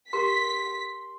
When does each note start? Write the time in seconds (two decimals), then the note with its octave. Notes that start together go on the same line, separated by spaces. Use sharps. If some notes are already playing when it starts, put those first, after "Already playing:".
0.13 G4 A#4 C6 B6